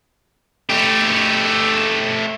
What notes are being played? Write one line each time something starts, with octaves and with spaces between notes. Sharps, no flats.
A3 G4